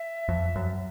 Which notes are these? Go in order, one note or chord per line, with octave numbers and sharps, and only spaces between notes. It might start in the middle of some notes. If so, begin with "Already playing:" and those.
Already playing: E5
F2
F#2